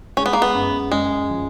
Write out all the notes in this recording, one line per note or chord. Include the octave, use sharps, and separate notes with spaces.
G#3 C#4
B3
A#3
B3
F#2
F#2 G#3
F3